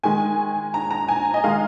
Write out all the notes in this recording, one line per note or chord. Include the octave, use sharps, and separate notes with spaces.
D#3 G#3 G#5
A#5
A#5
G#5
D#5
D#3 G#3 F5